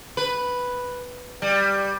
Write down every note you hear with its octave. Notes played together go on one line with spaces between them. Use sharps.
B4
G3